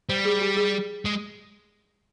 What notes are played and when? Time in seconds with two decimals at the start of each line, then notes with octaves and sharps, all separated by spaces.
0.09 G3 C5
0.25 G#4
0.41 G4
0.57 G#4
1.05 G#3